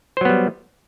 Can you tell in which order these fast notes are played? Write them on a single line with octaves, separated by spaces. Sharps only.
C5 F#3 B3 G3